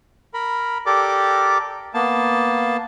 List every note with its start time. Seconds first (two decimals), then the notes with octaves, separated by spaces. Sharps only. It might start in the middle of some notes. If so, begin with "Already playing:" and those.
0.34 A#4 B5
0.86 G4 A4 A#4 D5 D6
1.94 A#3 B3 A5